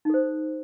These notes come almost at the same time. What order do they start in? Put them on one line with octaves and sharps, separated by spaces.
D#4 A4 C5